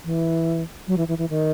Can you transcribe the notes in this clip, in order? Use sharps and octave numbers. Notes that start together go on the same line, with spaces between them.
E3
F#3
E3
E3
E3
D#3